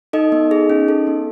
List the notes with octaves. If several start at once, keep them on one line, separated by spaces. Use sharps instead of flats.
D#4 A4 D#5
B3
G#4
C#4
A4
B3